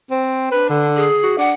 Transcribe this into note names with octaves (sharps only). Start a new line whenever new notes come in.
C4
D4 B4
D3
G#4
F#4
D4 F#5